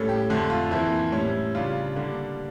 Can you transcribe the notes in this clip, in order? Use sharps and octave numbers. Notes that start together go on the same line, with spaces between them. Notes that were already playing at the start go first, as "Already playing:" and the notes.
Already playing: A2 G3 C#4 A4
G4
F2 D3 A3
F4
F2 E3 A#3 E4
A2 G3 C#4
C#3 G3 D4 F4
D3 G3 A#3 D4